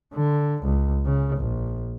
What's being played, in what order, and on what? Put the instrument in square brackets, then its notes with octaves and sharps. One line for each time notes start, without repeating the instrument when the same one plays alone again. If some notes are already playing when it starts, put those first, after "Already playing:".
[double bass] D3
C#2
C#3
A#1